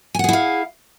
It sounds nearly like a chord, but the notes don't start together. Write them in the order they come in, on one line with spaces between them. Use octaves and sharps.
G#5 F#5 G#4 E4 F5